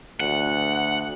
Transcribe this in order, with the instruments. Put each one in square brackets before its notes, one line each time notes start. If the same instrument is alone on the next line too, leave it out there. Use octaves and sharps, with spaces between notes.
[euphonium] D2 [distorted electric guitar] F#5